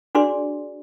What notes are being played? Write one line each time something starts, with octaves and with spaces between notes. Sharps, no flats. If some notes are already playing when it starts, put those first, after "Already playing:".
D4 F#4 G#4 D5 C6